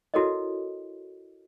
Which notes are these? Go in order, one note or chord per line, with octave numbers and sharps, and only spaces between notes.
E4 F#4 A4 A#4 C#5 D#5